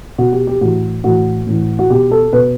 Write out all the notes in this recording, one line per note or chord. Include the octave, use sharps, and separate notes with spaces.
B2 F#4
G4
G4
A2 E3 F#4
A2 E3 F#4
A2 E3
F#4
B2 G4
A4
B2 B4